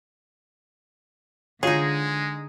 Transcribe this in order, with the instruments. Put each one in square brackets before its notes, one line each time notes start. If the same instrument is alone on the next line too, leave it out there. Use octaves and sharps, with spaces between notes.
[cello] D3 [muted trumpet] G#3 [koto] D#4 G#4 [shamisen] F4 C#5